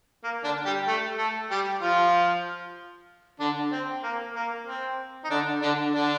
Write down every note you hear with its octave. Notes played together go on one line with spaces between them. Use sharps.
A#3
D3 D4
G3 G4
A3 A4
A3 A4
G3 G4
F3 F4
D3 D4
C4
A#3
A#3
C4
D#4
D3 D4
D3 D4
D3 D4